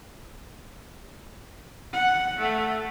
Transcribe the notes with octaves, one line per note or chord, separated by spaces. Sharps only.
F#5
A3